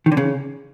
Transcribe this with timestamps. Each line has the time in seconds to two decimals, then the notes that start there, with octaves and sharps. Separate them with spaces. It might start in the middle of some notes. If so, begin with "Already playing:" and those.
0.06 D#3
0.12 D3
0.17 C#3